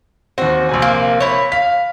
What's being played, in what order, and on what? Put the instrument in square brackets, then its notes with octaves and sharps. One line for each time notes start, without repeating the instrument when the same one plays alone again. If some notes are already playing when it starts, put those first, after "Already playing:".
[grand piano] D#2 C4 [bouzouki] F#4
[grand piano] A#1 C3 G#5
[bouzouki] A#3
E4 C#5
[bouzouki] F5 [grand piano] B6